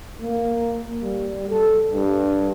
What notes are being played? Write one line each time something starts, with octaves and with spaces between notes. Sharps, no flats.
A#3
G3
A4
G2